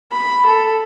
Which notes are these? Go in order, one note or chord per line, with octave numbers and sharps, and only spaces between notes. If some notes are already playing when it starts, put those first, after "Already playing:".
B5
A4